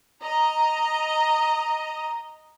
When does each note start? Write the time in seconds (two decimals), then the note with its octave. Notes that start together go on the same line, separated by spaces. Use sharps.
0.22 D#5 A#5